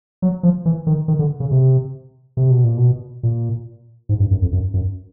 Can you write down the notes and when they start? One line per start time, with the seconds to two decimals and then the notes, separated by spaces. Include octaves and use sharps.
0.22 F#3
0.43 F3
0.65 E3
0.87 D#3
1.08 D#3
1.19 D3
1.40 C#3
1.51 C3
2.37 C3
2.50 B2
2.64 A#2
2.77 B2
3.23 A#2
4.09 G#2
4.20 G2
4.31 F#2
4.42 F2
4.52 F#2
4.74 F#2